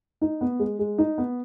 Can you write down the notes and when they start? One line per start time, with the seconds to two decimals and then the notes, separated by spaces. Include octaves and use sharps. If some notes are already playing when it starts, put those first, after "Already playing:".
0.22 D#4
0.41 B3
0.59 G#3
0.79 G#3
0.98 D#4
1.18 B3